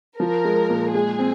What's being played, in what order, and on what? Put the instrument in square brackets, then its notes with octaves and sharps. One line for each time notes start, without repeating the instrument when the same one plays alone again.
[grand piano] F3 [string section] A#4
[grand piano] G#3
A#2
[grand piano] G#3 [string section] G#4
[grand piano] C4